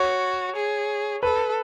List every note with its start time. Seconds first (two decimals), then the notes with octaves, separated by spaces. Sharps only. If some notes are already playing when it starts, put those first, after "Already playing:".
Already playing: F#4 C#5
0.56 G#4
1.23 A4 B4